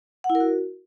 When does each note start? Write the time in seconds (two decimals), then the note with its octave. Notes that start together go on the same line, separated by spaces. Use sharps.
0.24 F#5
0.30 E4
0.35 A#4
0.40 F#4